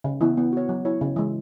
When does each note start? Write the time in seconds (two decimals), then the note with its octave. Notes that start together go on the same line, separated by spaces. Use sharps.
0.04 C#3
0.21 E3 B3 E4
0.37 B3
0.53 F#4 C#5
0.69 F#3
0.85 E4 C#5
1.01 C#3
1.16 E3 G#3